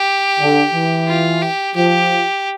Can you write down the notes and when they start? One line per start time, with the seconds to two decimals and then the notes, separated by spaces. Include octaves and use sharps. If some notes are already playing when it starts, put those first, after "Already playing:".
Already playing: G4
0.39 D3
0.73 E3
1.07 F4
1.42 G4
1.75 F3 G4